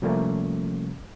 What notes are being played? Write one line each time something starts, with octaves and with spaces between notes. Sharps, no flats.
C3 F3 G3 A3 A#3 C#4